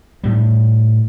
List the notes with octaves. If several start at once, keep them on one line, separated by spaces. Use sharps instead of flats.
A2 G3